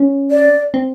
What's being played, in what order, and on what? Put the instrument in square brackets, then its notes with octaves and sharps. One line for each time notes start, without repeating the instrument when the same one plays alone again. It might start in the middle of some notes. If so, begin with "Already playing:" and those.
Already playing: [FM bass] C#4
[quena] D5
[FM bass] C4